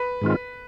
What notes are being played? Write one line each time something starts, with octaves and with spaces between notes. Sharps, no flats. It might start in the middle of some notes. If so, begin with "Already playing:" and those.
Already playing: B4
G#2 D#3 G#3 C4 F4